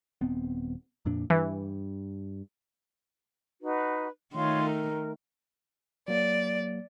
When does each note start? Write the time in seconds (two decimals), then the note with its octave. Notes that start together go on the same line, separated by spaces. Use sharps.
0.21 D#1 B3 C4
1.05 F2 A#2 D4
1.30 G2 E3
3.61 D#4 F#4 B4
4.34 D#3 A3 F4 C#5 C6
4.64 A#4
6.08 F#3 A#3 D5